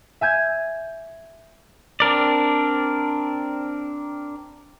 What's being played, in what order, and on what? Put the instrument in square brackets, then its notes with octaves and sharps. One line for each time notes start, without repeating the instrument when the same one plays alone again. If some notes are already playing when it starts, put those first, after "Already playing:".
[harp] E5 G#5 G6 G#6
[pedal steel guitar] C4 D4 A#4 D5